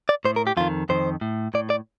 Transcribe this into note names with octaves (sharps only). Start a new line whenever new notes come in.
D5
A2 C5
A#4
G4
F2 D#3 F4
F2 D#3 C5
A2
A2 D5
D5